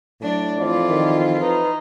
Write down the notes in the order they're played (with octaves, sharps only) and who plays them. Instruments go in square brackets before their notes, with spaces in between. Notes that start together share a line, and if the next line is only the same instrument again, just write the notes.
[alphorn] A2 [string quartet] F#3 D4 D5
[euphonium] F2 [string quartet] E3 E4 F4 [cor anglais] D5
[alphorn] D#3
[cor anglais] D#4 [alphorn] B4